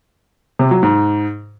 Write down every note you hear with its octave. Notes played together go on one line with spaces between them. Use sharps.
C3
F#3
G#2